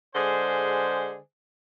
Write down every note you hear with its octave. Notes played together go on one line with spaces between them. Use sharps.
D3 G#3 G#4 C5